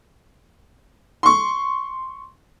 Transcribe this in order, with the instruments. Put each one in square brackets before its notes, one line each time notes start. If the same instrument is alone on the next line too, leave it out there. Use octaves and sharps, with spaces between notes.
[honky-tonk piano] C6 C#6